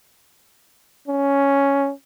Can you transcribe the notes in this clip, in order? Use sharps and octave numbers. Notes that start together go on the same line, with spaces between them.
C#4